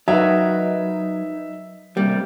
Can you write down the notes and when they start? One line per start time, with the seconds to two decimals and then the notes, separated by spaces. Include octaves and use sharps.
0.08 F#3 D#4 A#4 B4 E5
1.97 C3 G3 A#3